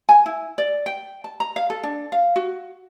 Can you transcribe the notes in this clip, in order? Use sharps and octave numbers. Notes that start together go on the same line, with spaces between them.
G#5
E4
D5
G5
A5
A#5
F5
A4
D4
F5
F#4